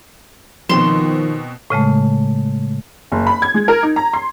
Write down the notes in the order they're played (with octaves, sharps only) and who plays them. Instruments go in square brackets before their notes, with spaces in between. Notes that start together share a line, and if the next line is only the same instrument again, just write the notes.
[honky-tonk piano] B2 C4 E7 [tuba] D#3 [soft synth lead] F3 [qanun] C6
[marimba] A2 C#3 G#3 A3
[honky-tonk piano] F#1
B5
G#6
G#3
A#4
D#4
A#5
C6